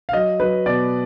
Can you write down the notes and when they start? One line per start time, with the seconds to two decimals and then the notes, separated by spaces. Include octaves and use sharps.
0.09 F5
0.13 F#3 D#5
0.40 F#3 B4
0.66 B2 D5